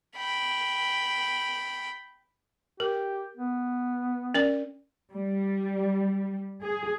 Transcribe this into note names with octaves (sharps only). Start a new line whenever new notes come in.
G5 B5
G4 A#4
B3
C#4 A#4 D5
G3
G#4